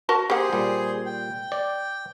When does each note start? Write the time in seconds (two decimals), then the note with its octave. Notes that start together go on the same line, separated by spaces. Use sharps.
0.09 F#4 A#4 A5
0.30 A#3 G4 G#4 C5 F#5
0.53 A#2 G3
1.06 G5
1.52 D5